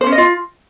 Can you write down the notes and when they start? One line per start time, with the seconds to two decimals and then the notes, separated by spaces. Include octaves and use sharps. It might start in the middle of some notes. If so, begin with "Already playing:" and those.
0.01 C5
0.07 C#4
0.12 D#5
0.18 F4